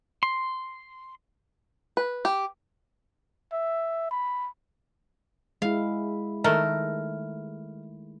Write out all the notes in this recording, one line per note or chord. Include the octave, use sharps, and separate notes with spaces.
C6
B4
G4
E5
B5
G#3 E4 F5
D#3 A3 A#4